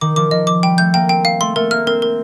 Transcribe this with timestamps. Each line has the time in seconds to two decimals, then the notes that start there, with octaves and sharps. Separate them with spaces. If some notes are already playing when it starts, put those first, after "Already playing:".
0.01 D#3 D6
0.16 F3 D6
0.31 F3 D#5
0.47 D6
0.63 G3 G5
0.78 A3 G6
0.94 A#3 G5
1.09 C4 G5
1.25 F5
1.40 A3 C6
1.56 A3 A#4
1.71 A#3 F6
1.86 C4 A#4
2.02 A#4